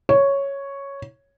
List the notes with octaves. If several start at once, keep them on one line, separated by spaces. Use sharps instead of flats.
C#5